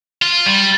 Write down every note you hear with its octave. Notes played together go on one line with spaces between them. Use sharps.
F4
G3